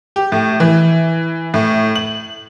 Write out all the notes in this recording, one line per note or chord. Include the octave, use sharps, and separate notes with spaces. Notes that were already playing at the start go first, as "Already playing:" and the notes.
G4
A2
E3
A2
F#7